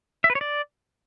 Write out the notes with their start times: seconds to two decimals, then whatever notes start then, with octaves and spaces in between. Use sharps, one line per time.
0.24 E5
0.30 B4
0.35 C#5
0.41 D5